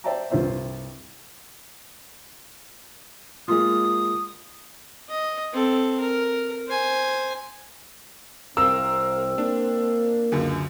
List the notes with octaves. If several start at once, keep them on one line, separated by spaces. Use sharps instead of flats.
C5 D5 E5 G5 A5 A#5
C2 G2 F4 C5 E5
G#3 A#3 F4 D#6
D#5
C4 A4
A#4
C5 G#5
C2 C4 A#4 F5 E6
A#3 D4
C#2 F#2 D3